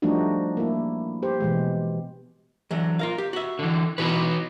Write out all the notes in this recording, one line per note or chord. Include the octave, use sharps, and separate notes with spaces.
F3 G3 A3 D4 D#4 F#4
A#3 E4
G4 C5
B2 E3 G#3
D3 E3 F#3
F4 A#4 F5
G4
F#4 E5
D3 E3
B2 E3 D#4 F#4 B4